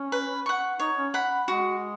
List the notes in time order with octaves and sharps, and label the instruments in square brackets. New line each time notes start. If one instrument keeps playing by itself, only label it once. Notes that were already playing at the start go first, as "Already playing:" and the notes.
Already playing: [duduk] C#4
[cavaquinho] B4
F#5 C#6
[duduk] D#4 [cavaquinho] C#5
[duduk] C#4
[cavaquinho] F#5 B5
[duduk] G#3 [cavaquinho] F#4